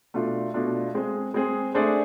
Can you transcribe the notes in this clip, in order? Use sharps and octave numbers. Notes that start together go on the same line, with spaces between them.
B2 A3 D4 F4
B2 A3 D4 F4
G#3 C4 G#4
G#3 C4 G#4
A3 D4 G#4 C5